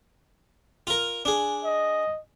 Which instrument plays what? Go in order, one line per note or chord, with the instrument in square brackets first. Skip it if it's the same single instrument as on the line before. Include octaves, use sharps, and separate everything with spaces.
[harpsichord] F4 A#4
[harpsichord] D4 G#4 [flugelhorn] G#5
[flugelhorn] D#5